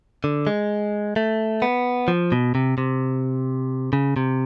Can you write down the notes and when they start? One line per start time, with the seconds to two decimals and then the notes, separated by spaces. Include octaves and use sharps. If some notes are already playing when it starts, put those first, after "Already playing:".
0.24 D3
0.47 G#3
1.16 A3
1.62 B3
2.08 F3
2.32 B2
2.55 C3
2.78 C3
3.93 C#3
4.16 C3